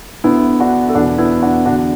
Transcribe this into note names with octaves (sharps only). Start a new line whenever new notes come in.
D2 D3 B3 E4
D4 F#4
A4
E2 B2 D4 F#4
B3 E4
D4 F#4
E2 D3 D4 F#4